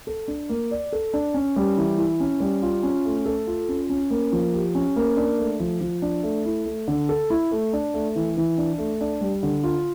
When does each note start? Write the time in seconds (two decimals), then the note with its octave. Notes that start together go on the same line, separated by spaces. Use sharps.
0.07 A4
0.28 D4
0.49 A#3
0.71 D5
0.93 A4
1.13 D4
1.34 C#4
1.56 G3
1.77 E3
1.98 E4
2.20 C#4
2.40 G3
2.62 F4
2.83 C#4
3.05 A3
3.26 A4
3.47 F4
3.69 C#4
3.90 C#4
4.10 A#3
4.32 F3
4.53 G4
4.75 C#4
4.96 A#3
5.17 D4
5.39 A3
5.60 F3
5.81 F3
6.02 D4
6.23 A3
6.45 E4
6.66 A3
6.88 D3
7.09 A4
7.30 E4
7.52 A3
7.73 D4
7.94 A3
8.16 E3
8.37 E3
8.58 D4
8.78 A3
9.01 D4
9.21 G3
9.43 D3
9.64 F4